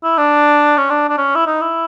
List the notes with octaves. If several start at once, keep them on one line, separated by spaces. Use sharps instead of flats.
E4
D4
C#4
D4
D4
C#4
E4
D#4
E4